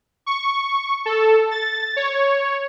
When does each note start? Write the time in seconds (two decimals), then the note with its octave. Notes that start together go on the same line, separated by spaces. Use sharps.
0.26 C#6
1.06 A4
1.51 A6
1.96 C#5